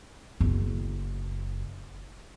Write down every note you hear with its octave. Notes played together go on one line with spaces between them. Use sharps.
F#1 E4